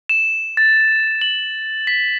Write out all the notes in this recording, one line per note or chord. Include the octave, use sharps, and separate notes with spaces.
E7
A6
F#7
B6